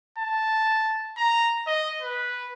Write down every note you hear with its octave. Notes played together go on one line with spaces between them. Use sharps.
A5
A#5
D#5
B4